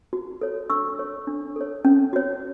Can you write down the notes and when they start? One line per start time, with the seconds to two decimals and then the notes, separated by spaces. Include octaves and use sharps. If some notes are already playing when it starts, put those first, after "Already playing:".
0.13 F#4
0.41 A4 C#5
0.70 D4 C#6 E6
0.99 A4 C#5
1.27 D4
1.56 A4 C#5
1.85 C#4
2.13 F#4 C#5